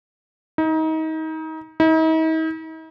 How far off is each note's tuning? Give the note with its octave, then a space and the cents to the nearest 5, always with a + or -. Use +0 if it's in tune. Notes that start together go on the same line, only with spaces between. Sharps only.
D#4 +30
D#4 +45